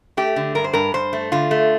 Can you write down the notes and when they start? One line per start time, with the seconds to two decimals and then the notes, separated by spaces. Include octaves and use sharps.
0.17 A3 G4
0.36 D3
0.55 G2 A#4
0.64 C5
0.73 G2 A#4
0.94 G2 C5
1.13 A3
1.32 D3 F4
1.51 A3